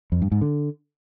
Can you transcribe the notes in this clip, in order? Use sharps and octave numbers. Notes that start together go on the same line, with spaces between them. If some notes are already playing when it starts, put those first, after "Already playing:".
F2
G2
G#2
D3